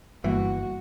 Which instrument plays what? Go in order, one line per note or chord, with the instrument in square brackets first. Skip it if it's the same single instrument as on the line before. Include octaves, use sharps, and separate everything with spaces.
[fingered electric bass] G1 [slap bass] E3 [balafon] G3 A#3 [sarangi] F#4